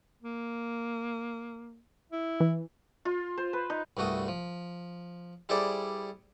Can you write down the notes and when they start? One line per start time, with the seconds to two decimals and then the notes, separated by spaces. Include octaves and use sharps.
0.22 A#3
2.12 E4
2.40 E3
3.05 F4
3.38 C5
3.53 B4
3.70 D#4
3.97 C2 G2 A3 F#4 D#6
4.28 F3
5.49 G3 E4 G#4 A4 C5 D5